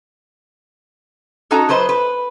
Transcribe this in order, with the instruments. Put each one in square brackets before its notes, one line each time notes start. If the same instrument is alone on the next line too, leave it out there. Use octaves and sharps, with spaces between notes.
[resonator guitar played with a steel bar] C#4 D#4 F#4 A4 D#5 A#5
F#3 B4 C5 D#5
B4